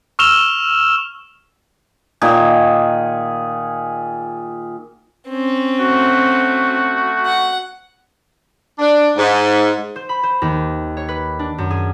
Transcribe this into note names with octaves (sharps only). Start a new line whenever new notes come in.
C#6 E6 F6 E7 F7 G7
A#2 D#3 G#4
C4 C#4
A3 F#4
F#5
D4
G#2
C5
B5
C5
D#2
C#5
B4
D4
F#2
G#4